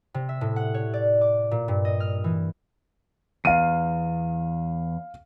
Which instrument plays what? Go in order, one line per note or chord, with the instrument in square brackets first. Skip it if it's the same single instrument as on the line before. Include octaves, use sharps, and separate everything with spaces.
[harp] C3
E5
A2
F#5
C#5
D5
D6
A#2
G2
D#5
F6
E3
[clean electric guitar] E2 [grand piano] F5 D#7